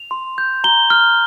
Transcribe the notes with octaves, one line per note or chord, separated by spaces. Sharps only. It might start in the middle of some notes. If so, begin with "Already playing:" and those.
Already playing: F7
C6
G6
A#5 G7
F6